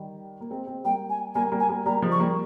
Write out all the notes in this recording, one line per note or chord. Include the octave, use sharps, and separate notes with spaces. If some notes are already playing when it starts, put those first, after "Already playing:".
Already playing: D#3 G3
A#3
G#3 C4
G#3 C4
G3 A#3 G5
G#5
G3 A#3 G#5
G3 A#3
G#5
G3 A#3
G3 A#3 A#5
F3 G#3
C#6
G3 A#3